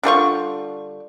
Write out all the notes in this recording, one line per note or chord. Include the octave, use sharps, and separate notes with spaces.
D3 G3 F4 C#6